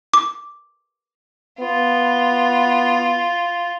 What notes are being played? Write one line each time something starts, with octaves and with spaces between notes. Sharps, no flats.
D6
B3 F4